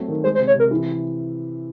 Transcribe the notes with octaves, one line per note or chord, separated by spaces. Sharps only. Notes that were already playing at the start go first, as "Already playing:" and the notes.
Already playing: F#3 A3 C4
D#3
G#3 C5
C5
C3
C#5
C3 A#4
E3